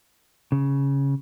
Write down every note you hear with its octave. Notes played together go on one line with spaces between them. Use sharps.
C#3